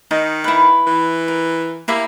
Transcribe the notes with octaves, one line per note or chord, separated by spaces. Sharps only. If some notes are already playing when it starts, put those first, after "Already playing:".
D#3 D#4
E4 B4
E3
A#4
A#3 E4 G4 E5